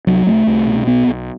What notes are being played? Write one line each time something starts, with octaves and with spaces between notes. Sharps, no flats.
C2 F#3
C2 A3
C2
B2
B1 B3
B1